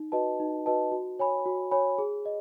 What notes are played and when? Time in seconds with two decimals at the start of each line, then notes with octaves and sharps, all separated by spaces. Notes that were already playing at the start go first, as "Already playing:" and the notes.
Already playing: D#4
0.12 F#4 B4 D#5 A5
0.40 D#4
0.66 F#4 B4 D#5 A5
0.92 F#4
1.19 C#5 G#5 B5
1.46 F#4
1.71 C#5 G#5 B5
1.98 G#4
2.26 D#5